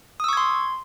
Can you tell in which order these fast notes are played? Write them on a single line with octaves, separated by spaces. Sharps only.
D#6 E6 C#6 G#6 C6